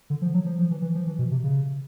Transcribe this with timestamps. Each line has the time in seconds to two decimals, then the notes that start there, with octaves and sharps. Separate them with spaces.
0.10 D3
0.22 F3
0.34 F#3
0.46 F3
0.59 F3
0.71 E3
0.82 E3
0.95 F3
1.07 E3
1.19 B2
1.31 C3
1.43 C#3